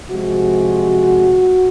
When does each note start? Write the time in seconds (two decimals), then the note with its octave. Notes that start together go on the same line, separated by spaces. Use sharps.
0.10 C3 F3 G#3 F#4